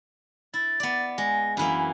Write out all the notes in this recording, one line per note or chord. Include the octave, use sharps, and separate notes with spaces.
E4 A6
B3 D5
G#3 A#6
F#2 E3 A#3 B5